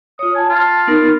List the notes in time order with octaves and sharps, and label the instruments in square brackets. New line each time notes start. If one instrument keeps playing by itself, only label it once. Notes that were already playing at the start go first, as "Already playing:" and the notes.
[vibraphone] F4 C#5 [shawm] D#6
[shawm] G#5 [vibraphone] A5
[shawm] F4
[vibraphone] B3 D#4 A#4